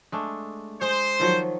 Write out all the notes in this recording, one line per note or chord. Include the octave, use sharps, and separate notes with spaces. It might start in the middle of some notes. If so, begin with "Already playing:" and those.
G#3 A3 D4
G#3 C5
D#3 F3 F#3